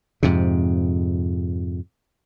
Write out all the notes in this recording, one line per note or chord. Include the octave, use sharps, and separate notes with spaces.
F2 G#2 C3